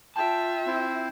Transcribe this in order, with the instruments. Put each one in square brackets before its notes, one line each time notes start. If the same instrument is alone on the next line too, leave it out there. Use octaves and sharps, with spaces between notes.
[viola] F4 E5 [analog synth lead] G5 [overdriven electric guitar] A5
[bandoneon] C4 E4 C5